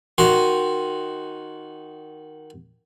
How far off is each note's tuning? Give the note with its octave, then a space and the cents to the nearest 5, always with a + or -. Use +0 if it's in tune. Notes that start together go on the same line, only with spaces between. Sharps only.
D#3 +0 F#4 +0 C6 +0